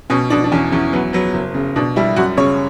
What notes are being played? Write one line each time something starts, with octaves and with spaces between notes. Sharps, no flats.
B2 C#4
B2 D4
D4
E2 C#4
E2 C#4
F#3 B3
F#3 B3
F#1
C#3
B2 D4
G3 E4
F#2 F#4
C#3 C#5